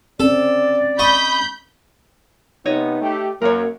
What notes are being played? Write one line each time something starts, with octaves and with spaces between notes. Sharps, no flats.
C4 C#4 A4 D5
D#5 B5 C#6 G6
C3 B3 D#4 C#5 D#5
A3 G4
F#2 A#3 A#4 C#5